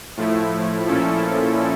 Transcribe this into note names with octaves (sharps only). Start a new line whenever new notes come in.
A2 F3 A3 E4
A#2 F3 C#4 E4 A4